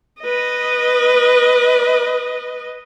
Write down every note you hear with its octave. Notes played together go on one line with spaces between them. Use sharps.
B4 D#5